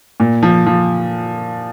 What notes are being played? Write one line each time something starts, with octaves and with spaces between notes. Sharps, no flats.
A#2
F3
F3